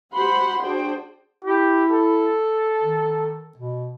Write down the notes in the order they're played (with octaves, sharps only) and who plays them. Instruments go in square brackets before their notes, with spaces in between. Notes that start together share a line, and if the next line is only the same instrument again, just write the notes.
[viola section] F#4 G4 C5 F#5 B5 C6
D4 F#4 G#4 C5 G5
[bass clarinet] E4 [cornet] G4
[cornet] A4
[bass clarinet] D#3
B2